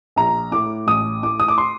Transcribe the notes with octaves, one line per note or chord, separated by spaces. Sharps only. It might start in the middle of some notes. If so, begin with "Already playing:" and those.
A#1 A#5
A2 D6
A1 D#6
A2 D6
D#6
D6
C6